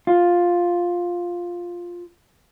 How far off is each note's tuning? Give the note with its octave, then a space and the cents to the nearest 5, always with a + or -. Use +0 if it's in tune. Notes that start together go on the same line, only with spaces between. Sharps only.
F4 +5